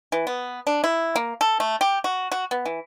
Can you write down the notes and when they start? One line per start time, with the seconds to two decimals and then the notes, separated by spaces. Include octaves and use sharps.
0.12 E3
0.27 B3
0.67 D4
0.84 E4
1.16 A#3
1.41 A4
1.60 A3
1.81 G4
2.04 F#4
2.32 F#4
2.51 B3
2.65 E3